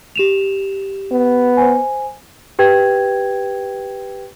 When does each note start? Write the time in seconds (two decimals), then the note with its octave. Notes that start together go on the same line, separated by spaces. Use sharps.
0.16 G4 E7 F7
1.11 B3
1.57 C5 G#5
2.59 G4 B4 G5 G#6